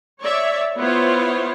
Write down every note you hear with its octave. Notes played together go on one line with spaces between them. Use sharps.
C#5 D5 E5
B3 E4 F4 C5 C#5